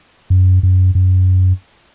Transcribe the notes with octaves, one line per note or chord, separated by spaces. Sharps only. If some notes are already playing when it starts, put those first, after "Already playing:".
F#2
F#2
F#2